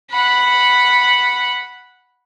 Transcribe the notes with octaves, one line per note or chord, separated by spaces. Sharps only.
F#5 B5